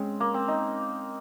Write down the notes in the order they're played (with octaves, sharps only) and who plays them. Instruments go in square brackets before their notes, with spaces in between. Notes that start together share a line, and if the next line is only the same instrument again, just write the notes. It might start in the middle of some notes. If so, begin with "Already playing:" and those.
Already playing: [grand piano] G#3 C#4 G#4 [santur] C4
[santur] A#3
C4
D#4